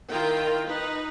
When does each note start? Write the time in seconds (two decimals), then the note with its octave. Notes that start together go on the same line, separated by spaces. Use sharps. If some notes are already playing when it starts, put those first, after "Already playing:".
0.10 D#3 E4 F4 A#4 G5
0.66 D#4 B4